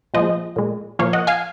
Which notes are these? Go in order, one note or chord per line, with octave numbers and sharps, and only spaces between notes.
A#2 F3 G#3 C5 D#5
A#2 G#3
A#2 F3 A#3 C#5 F5
D#5 F#5
F5 G#5